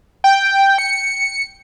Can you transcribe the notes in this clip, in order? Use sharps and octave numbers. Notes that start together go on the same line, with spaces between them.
G5
C#7